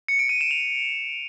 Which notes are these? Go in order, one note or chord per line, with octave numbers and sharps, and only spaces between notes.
C#7
D7
D#7
E7
F7